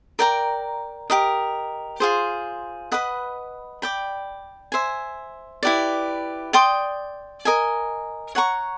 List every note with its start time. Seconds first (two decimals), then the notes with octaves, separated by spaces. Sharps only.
0.19 A#4 D5 G5 A#5
1.10 G4 A#4 D#5
2.00 F4 G#4 C5
2.92 B4 D#5 F#5 B5
3.82 D5 G5 B5
4.72 C5 E5 G#5
5.63 E4 G4 B4 D5
6.53 D5 G5 C6 D#6
7.45 A#4 D#5 G#5
8.35 C#5 F#5 A#5 C#6